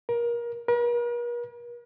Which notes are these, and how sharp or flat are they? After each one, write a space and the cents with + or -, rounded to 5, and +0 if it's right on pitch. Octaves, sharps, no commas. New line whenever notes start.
A#4 +25
A#4 +45